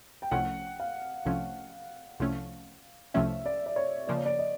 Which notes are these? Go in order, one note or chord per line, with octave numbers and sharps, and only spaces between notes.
G5
C2 C3 F3 A3 C#4 F#5
F5
C2 C3 F3 A3 C#4
C2 C3 F3 A3 C#4
C2 C3 F3 A3 C#4 E5
D5
D5
C#5
C#3 F3 A#3 D5
C#5
D5
D#5